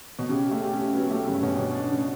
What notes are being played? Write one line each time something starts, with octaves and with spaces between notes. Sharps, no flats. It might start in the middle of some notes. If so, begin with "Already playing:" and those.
B2
C#3 G4
A3 G4
G4
C#4 G4
F#3 B3
A3 G4
G2 C#3
B2 C#4
B2 D4
D4
C#3